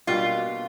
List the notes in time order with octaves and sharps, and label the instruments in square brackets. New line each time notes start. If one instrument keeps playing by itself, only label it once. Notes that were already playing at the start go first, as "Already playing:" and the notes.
[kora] B2 G3 A#3 D4 [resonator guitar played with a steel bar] F4